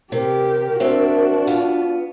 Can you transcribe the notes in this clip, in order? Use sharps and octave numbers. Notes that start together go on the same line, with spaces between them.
C3 G4 A#4
C4 D4 F#4 E5
B3 F4